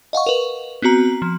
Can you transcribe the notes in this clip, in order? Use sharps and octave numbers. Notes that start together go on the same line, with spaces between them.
D#5 F5 F#5 C#6
A#4 B4
B3 C4 F#4 A#5
F3